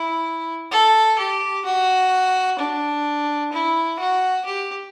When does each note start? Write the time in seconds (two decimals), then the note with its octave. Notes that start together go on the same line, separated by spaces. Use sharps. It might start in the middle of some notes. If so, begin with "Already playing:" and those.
Already playing: E4
0.71 A4
1.18 G4
1.65 F#4
2.59 D4
3.52 E4
3.99 F#4
4.45 G4